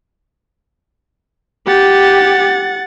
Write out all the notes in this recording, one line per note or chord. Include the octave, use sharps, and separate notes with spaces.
G4 F#5 A6